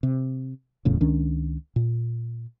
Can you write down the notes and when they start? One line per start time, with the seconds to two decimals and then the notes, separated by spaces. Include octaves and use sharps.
0.03 C3
0.85 D1 E2 A2 C#3
1.01 C#2 D#3 C#4 D4
1.76 A#2